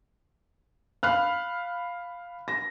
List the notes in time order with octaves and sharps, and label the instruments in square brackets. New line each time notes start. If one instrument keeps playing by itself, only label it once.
[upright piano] F5 F#6 [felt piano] B5 F6
[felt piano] A#6